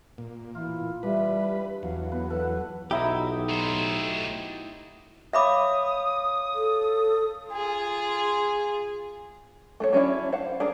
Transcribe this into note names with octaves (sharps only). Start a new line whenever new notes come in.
A#2
E3 F4
E3 G3 D4 B4
E2 F#3 F5
B3 B4
A4 B4 F#5
B1 D#4 E4 F#4 G4 E5
A3 C5
C#5 E5 F5 B5 D6 D#6
A4
F4 G#4
A3 A4 C#5
F#3 C#4 D4 E4
C5 F5 F#5
D4 G#4 A#4